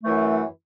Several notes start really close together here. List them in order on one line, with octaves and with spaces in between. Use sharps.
A3 E3 F#2